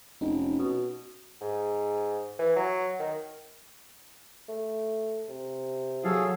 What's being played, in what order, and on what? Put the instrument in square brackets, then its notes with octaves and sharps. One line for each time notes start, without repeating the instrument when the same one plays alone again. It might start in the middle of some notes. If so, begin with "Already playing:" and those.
[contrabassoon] F1 [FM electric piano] C#4 D#4
[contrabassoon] B2
[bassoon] G#2
E3
F#3
D#3
A3
C3
[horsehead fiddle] F#3 [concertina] G#4 A4 F5